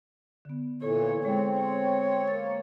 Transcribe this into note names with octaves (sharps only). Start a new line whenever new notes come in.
D3 B3
A#2 E3 A4 C#5
G#3 C4 G#4 C#5
C#5
A#3 A6